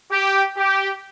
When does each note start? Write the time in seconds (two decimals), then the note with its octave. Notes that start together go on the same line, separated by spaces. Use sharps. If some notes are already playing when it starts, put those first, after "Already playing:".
0.11 G4
0.57 G4